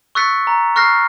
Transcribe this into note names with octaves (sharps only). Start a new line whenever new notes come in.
C#6 E6 F#6 A6 B6 C#7
A#5
C#6 F6 F#6 A#6 C7